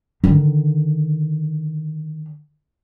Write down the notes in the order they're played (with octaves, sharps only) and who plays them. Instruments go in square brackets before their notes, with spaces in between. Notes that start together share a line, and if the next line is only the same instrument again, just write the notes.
[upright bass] D3 D#3